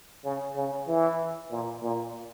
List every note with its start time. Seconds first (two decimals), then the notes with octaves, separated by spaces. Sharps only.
0.24 C#3
0.56 C#3
0.88 E3
1.51 A#2
1.83 A#2